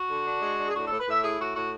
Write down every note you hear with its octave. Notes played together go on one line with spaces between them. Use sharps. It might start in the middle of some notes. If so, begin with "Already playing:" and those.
Already playing: F#4
D3
D4
G#3
D4
G#4
A2 F#4
A2 A4
B4
A2 E5
E4 G#4
A2 F#4
A2 F#4